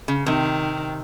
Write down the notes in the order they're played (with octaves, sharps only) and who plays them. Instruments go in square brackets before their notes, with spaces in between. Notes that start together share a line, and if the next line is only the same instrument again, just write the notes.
[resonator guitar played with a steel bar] C#3
[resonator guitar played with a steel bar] C3 [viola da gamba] D#3